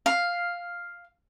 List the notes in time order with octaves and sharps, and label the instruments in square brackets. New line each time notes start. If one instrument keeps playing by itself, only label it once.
[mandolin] F5